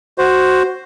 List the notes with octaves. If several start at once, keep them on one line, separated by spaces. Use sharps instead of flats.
F#4 C5